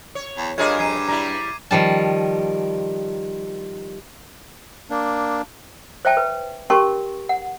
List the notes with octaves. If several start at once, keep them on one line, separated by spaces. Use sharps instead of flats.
C#5
E2
G2 F4 G#4 A#4 C#5 D#5 D6 G#6
F2 G#6 C7 D#7
G3 E4 A#5
D#3 F3 G3 A5
A#3 D4
C5 D5 E5 G5 A5
B4
C#4 G4 A#4 A5 C6 C#6
F#5